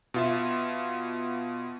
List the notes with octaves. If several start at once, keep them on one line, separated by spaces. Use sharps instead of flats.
B2 F4 E5